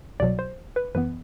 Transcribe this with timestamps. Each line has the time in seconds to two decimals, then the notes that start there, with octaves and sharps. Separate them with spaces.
0.20 C2 B2 F#3 D5
0.39 C5
0.76 B4
0.95 F#2 E3 B3 B4